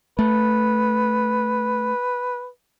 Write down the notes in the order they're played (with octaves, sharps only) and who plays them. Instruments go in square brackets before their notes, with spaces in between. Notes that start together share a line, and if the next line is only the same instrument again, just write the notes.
[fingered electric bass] A3 [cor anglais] B4